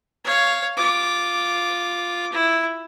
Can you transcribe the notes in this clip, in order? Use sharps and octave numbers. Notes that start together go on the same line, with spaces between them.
C#5 F5
F4 D6
E4